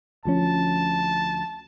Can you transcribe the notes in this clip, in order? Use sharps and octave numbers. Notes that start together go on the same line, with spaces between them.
D2 F3 C#4 A5